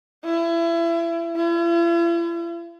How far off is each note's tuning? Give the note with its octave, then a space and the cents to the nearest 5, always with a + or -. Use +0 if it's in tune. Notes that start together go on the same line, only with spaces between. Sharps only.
E4 +30
E4 +45